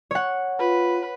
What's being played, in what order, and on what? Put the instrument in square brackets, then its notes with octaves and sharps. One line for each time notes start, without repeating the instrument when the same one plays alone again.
[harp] C#5 F#5
[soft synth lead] F4 [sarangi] B4